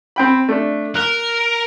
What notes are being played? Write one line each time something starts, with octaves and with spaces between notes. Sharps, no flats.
C4 G5 B5
A3 D4
A#4 F#6